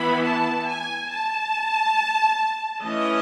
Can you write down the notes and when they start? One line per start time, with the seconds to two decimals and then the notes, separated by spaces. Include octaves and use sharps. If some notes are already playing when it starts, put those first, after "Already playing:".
Already playing: E3 B3 E4 B5
0.24 A5
0.67 G#5
1.10 A5
2.83 E3 A3 C#4 D#5